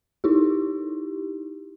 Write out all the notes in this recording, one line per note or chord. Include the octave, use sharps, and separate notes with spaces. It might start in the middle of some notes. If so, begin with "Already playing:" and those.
D#4 E4 G4